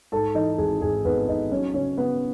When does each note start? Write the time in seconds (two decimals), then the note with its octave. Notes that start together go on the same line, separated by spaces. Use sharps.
0.12 G#2 A4 A5
0.35 E3 D#4 D#5
0.58 G#1 G#4
0.82 G#1 G#4
1.05 G#1 B3 B4
1.28 G#1 D#4 D#5
1.52 F#3 C#4 C#5
1.74 C#3 C#4 C#5
1.98 C#3 B3 B4